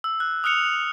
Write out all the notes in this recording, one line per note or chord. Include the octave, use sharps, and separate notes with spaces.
E6
F#6
D#6 F6 F#6 C#7 F7